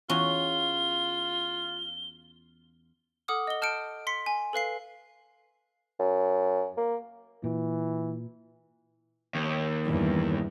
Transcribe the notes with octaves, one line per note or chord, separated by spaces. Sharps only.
E2 C#4 F4 F#4 G7
A4 F#5 D6 D#6 F6
D#5 G7
A5 F6 G6 C#7 D7
C6 B6 C#7
G#5
A4 B4 F5 C7
F#2
A#3
A#2 E3
D#2
E2 G2 E3